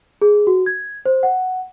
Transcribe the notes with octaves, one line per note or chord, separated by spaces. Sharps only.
G#4
F#4
G#6
C5
F#5